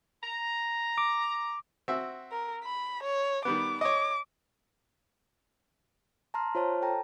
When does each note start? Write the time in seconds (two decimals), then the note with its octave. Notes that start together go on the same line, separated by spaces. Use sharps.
0.24 A#5
0.98 D6
1.88 C4 F#4 E5
2.32 A#4
2.64 B5
3.03 C#5
3.45 D#3 G3 B3 D6
3.81 C#5 D#5 D6
6.34 A5 A#5 C6 F6
6.55 F4 C5 C#5 A5 F6
6.82 A4 G5 A5 A#5